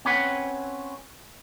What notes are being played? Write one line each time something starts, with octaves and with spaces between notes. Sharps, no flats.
C4 C#4 B4 F#5